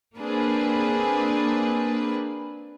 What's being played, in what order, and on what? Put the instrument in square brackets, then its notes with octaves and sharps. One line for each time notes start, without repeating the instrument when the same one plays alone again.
[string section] A#3 C4 D4 G#4 B4